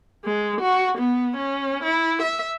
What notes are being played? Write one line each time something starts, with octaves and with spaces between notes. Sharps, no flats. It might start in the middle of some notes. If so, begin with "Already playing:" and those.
G#3
F#4
B3
C#4
E4
E5